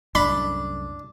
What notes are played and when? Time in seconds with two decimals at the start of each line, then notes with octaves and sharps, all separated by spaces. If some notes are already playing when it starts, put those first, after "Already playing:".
0.15 C2 F#2 A2 D4 B5